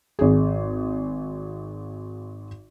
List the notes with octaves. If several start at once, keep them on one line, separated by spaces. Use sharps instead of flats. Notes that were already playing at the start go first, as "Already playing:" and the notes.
G#1 G#4